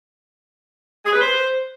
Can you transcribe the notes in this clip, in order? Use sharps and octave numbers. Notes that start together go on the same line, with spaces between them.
G#4
B4
C5